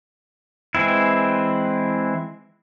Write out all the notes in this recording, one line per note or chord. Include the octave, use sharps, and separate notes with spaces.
E3 G#3 C4 E4